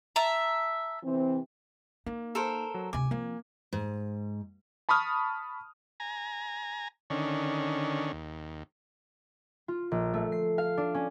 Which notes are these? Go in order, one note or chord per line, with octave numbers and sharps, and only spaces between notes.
E5 A5 A#5
C3 E3 C4
A#3 D#4
A4 A#4 C5
F#3
D2 C3 G#5 D6
F3 A#3 C4
G#2
A5 B5 C#6 D#6 F6
G#5 A#5
D3 D#3 C#4
D#2
F4
A#1
A3
C7
F5
D4
C#4